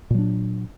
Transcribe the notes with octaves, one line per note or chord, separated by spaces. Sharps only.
A#2 F#3 D4